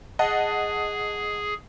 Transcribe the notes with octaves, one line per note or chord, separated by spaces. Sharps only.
G#4 D#5 F#5 A5